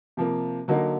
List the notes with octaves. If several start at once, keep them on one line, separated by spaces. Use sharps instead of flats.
C3 F3 A#3
D3 F#3 A#3 D#4